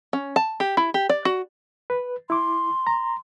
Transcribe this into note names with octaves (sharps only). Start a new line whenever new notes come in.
C#4
A5
G4
E4
G4
D5
F#4
B4
E4 C6 D6
A#5